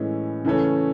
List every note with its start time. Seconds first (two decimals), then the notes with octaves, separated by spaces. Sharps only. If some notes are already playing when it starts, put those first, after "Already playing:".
Already playing: A2 E3 G#3 C#4
0.45 C#3 E3 A3 C#4